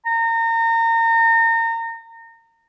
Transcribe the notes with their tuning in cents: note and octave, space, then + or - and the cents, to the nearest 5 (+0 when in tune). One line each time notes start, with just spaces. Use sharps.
A#5 -30